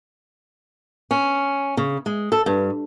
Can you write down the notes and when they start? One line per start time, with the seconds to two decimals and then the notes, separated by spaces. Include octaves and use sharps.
1.11 C#4
1.77 C#3
2.06 G#3
2.32 A4
2.46 G2